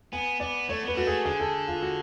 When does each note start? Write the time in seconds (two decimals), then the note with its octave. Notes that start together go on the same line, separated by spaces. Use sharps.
0.13 B3 G#5
0.40 B3 D5
0.69 A3 C#5
0.82 B3
0.88 B4
0.95 A3 F#4
1.07 G#4
1.25 D3 G#4
1.40 A4
1.67 F4
1.82 F#4